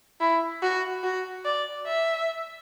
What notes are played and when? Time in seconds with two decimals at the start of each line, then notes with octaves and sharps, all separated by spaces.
0.20 E4
0.62 F#4
1.04 F#4
1.45 D5
1.86 E5